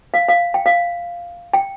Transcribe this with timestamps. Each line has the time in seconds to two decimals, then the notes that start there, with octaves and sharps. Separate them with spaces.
0.14 F5
0.28 F5
0.54 G5
0.66 F5
1.53 G5